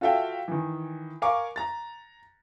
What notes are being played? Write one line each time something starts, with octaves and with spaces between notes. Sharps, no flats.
F4 F#4 A4 E5 F5 G5
D#3 E3
A#4 F5 G#5 C#6 D6
A#5 A6